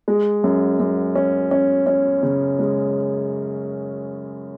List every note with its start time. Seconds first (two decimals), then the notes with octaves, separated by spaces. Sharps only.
0.08 G#3
0.44 F#2
0.80 F#2
1.15 C#4
1.51 C#4
1.87 C#4
2.23 C#3
2.59 G#3